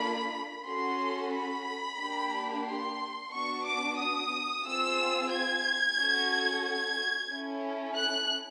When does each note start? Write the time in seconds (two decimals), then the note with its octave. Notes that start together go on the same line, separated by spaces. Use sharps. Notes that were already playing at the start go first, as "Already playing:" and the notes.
Already playing: A#3 D4 F4 A4 B5
0.66 C#4 F#4 A4 C6
1.33 B5
1.99 A#3 D4 G4
2.66 C6
3.32 B3 D4 F#4 C#6
3.65 D6
3.98 D#6
4.65 C4 F4 G#4 E6
5.31 G#6
5.97 C#4 F#4 A4
6.64 G#6
7.31 C#4 E4 A4
7.97 F#6